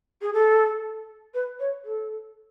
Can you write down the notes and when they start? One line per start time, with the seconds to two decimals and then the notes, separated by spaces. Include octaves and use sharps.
0.22 G#4
0.33 A4
1.34 B4
1.60 C#5
1.85 A4